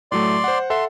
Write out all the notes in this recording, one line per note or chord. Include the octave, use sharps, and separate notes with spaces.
A2 F#3 A3 D5 C6
C5 F#5
A4 E5 F#5 C6